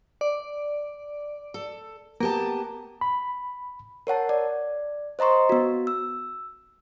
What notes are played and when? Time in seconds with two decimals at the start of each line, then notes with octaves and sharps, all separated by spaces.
0.21 D5
1.54 A4
2.20 A#3 B3 G4 A5
3.01 B5
4.07 A#4 C#5 F#5 A5
4.29 D5
5.19 C5 D#5 A#5 C6 C#6
5.49 B3 F#4
5.87 E6